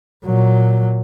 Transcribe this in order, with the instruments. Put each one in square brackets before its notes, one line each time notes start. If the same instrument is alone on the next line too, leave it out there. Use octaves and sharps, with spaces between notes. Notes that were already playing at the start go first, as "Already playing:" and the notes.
[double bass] A#2 F#3